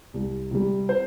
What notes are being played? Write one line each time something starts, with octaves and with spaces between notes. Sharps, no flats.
C2
C3 G3
C5